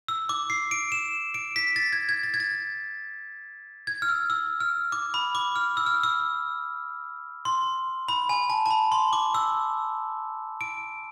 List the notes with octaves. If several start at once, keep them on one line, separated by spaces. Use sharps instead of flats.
E6
D6
C7
D7
E7
D7
B6
A6
G#6
G#6
A6
G#6
A6
G#6
F6
E6
E6
F6
D6
B5
D6
F6
E6
F6
E6
C6
B5
G#5
A5
A5
B5
C6
D6
E6
D7